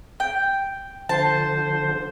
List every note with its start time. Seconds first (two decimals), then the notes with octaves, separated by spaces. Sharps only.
0.20 G5
1.09 D3 F3 C5 A5